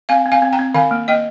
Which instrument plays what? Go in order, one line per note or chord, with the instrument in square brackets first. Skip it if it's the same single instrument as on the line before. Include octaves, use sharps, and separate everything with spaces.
[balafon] C4 F5 G#5
C4
F5 G#5
C4
G5 A#5
C4
D#3 F5 G#5
A#3
A#3 D#5 G5